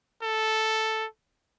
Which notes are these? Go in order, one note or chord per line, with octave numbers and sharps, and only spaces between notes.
A4